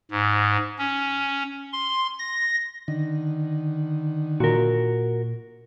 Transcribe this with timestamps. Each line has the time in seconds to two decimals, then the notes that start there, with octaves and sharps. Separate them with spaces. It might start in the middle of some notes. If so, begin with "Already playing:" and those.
0.11 G#2
0.78 C#4
1.73 C6
2.19 A#6
2.88 D3 D#3
4.40 A#2 F#4 A#4